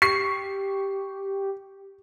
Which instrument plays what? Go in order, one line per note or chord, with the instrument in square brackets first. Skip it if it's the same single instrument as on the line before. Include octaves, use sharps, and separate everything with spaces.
[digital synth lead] G4 [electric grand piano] C#6 [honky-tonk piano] C7